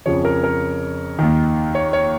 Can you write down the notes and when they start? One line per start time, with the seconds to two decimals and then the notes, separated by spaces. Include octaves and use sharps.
0.06 F2 C#3 F3 C#5
0.25 A#4
0.44 A#4
1.19 D#2 D#3
1.75 C#5
1.93 C#5